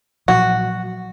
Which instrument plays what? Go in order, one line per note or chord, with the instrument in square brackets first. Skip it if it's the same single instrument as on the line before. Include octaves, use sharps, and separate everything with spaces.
[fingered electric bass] A#2 F3 F#3 [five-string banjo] F#4